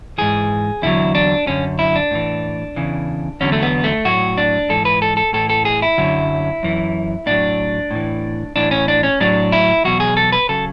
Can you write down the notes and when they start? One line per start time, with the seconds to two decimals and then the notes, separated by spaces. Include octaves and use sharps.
0.18 G#2 E3 G#4
0.82 E2 D3 F#3 E4
1.15 D4
1.46 F#2 D3 F#3 C#4
1.79 E4
1.96 D4
2.11 A2 E3
2.76 E2 C#3 E3
3.40 E2 D3 F#3 C#4
3.52 A3
3.62 B3
3.84 A3
4.05 A2 F#3 F#4
4.38 D4
4.69 G#2 E3 A4
4.85 B4
5.02 A4
5.17 A4
5.33 A2 E3 A4
5.50 A4
5.65 G#4
5.82 E4
5.98 F#2 D3 F#3
6.63 F#2 E3
7.26 A2 F#3 D4
7.91 A2 E3
8.56 A2 E3 D4
8.71 C#4
8.88 D4
9.03 C#4
9.20 A2 F#3 D4
9.52 E4
9.84 E2 B2 F#3 F#4
10.00 G#4
10.17 A4
10.32 B4
10.49 C#3 F#3 A4